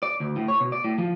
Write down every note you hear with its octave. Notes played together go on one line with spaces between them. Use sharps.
D5
D2
A2
C#5
B2
D5
A2
F3